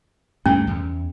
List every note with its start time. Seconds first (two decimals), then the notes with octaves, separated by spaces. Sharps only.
0.46 D2 G2 A3 C#4
0.67 E2